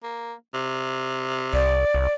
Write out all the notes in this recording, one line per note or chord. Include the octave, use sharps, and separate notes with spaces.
A#3
C3
C2 D5
C2